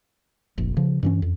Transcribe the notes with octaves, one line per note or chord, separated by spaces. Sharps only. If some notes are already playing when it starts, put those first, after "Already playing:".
F1 A#1
C#3 F3
G2 E3 C#4
F2